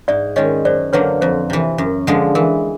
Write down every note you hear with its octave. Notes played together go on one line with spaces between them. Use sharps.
G#2 D5 E5
D#3 G#3 C#4 C#5 D#5
F#2 C5 D5
D3 F#3 A#3 B4 C#5
F2 C5
C3 E3
F#2
D3 F3 G#3
E3 A#4